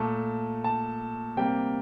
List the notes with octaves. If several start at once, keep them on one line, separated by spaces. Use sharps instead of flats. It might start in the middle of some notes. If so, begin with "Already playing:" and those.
Already playing: A#2 A3 A5
A5
C3 G3 A#3 G5